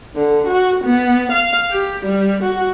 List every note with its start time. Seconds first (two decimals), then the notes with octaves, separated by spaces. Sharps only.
0.15 D3
0.47 F#4
0.84 B3
1.32 F5
1.71 G4
2.05 G3
2.43 F#4